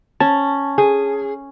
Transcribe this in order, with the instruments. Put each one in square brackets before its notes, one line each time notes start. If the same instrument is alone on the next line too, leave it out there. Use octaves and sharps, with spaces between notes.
[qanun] C#4 [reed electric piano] A5
[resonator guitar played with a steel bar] G#4